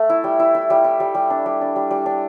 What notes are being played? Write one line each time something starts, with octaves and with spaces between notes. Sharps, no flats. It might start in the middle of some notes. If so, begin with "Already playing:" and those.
Already playing: A3
E4
G3
E4
E4
G3
E4
G3
G3
D4
G3
D4
G3
G3
D4